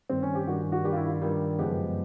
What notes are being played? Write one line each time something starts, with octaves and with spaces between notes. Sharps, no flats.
G2 D#3 G3 C4
C#4
G4
G2 D#3 G3 F#4
F#4
G2 D#3 G3 G4
F4
E4
F4
G2 D#3 G3
F#2 C#3 F3 G#3 B3 G4